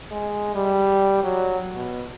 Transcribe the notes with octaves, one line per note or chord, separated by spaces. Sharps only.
G#3
G3
F#3
B2